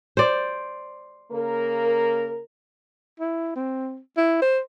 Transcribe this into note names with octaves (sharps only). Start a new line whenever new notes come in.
C5 D5
C#3 A#3 A#4
E4
C4
E4
C5